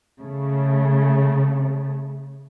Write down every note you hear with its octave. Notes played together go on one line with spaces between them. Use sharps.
C#3 A3